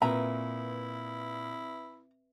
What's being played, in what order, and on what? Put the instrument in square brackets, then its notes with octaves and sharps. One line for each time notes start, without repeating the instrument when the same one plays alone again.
[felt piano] A#2 [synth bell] C4 B4 E5 [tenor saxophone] E4 [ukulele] A#5